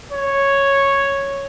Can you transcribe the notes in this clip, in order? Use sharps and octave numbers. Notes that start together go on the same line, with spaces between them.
C#5